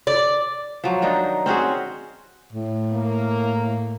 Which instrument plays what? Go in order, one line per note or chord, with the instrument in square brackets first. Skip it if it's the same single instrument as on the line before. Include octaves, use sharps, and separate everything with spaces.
[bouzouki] D5
[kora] F3 F#3
D#3 D4 D#4
C4 C#4 F#4 G#4
[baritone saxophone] A2
[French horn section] A#3